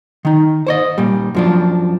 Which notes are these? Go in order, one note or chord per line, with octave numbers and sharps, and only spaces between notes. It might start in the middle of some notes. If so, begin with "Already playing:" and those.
D#3 D#4
C5 C#5 D#5
A#2 G3
F#2 F3 D4